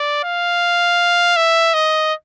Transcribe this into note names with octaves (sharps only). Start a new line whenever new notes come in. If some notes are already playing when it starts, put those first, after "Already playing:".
Already playing: D5
F5
E5
D#5